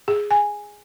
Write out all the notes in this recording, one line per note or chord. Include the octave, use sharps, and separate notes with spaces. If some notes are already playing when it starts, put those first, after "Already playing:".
G#4
G#5